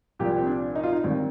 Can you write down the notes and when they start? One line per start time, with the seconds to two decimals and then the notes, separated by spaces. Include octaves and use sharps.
0.19 C2 A#2 F3 G4
0.38 C4
0.47 D4
0.75 D#4
0.84 F4
0.93 D#4
1.04 D#2 D3 G3 C4